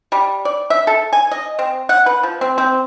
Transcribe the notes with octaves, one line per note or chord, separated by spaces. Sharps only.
G3
D5
E5
A4
G#5
D#5
C4
F#5
B4
F3
C4
C4